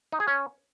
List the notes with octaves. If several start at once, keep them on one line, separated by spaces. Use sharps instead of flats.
D#4
G#4
C#4